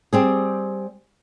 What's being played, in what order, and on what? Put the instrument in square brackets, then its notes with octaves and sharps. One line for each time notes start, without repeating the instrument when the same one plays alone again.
[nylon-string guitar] G3 C4 G#4